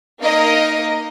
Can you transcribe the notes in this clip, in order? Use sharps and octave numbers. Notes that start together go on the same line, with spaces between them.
A#3 D#4 A#4 D#5